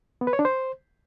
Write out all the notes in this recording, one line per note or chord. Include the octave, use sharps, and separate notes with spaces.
B3
B4
C#5
D4
C5